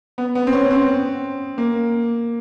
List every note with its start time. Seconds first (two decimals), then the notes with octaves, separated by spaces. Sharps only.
0.18 B3
0.35 B3
0.47 C4
0.53 C#4
0.71 C4
1.58 A#3